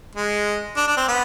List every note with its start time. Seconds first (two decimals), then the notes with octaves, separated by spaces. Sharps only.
0.15 G#3
0.77 D4
0.88 D4
0.97 C4
1.08 B3